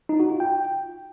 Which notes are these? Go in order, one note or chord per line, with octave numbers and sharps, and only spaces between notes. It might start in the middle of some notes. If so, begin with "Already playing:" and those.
D#4
F#4
F4
G5